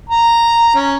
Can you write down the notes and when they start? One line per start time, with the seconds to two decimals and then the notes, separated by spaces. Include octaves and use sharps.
0.10 A#5
0.75 C#4